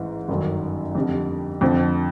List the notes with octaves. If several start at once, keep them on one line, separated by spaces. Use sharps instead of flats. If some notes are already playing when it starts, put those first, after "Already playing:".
Already playing: A1 G#2 E3
G1 F#2 D#3 F#3
F2 D3 G3
F2 D3 F3